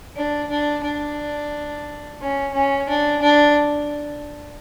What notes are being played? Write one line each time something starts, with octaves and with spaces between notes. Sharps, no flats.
D4
D4
D4
C#4
C#4
D4
D4